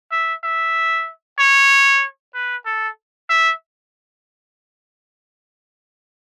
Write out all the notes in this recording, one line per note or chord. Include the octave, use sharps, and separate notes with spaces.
E5
E5
C#5
B4
A4
E5